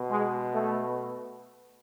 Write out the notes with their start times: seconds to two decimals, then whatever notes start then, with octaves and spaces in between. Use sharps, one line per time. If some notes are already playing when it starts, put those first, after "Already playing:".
Already playing: B2
0.11 G#3
0.54 A3